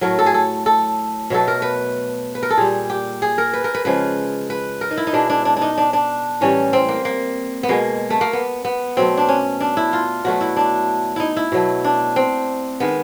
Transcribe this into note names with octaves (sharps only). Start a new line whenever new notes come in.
A2 F#3 A3 A#4
A4
G#4
A4
A4
B2 F#3 A3 A4
A#4
B4
B4
A#4
A4
A#2 G3 G#4
G4
G#4
A#4
B4
A#4
B4
C#3 F3 G#3 B4
B4
A#4
D#4
E4
D#4
B2 G#3 D4
D4
D4
D4
D#4
D4
D4
A2 E3 G3 C#4
C4
A#3
A#3
B3
B2 G#3 A#3
A3
A#3
B3
B3
B2 F#3 A3 C4
D4
C#4
D4
E4
F4
B2 F#3 A3 F#4
E4
D4
D#4 E4
E4
B2 F#3 A3
D4
C4
D#3 G#3 B3